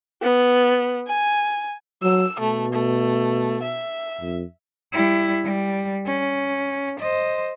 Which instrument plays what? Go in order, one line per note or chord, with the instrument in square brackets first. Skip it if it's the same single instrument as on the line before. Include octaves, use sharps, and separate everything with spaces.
[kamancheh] B3
G#5
[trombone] F#3 [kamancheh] E6
[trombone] B2 [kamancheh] A3
[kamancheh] A3
E5
[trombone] F2
[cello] G3 E4
G3
C#4
C5 D#5